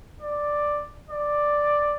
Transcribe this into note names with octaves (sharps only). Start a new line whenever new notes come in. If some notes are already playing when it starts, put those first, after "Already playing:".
D5
D5